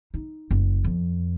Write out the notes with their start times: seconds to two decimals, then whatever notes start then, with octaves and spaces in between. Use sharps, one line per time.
0.14 D#4
0.51 F#1
0.84 F2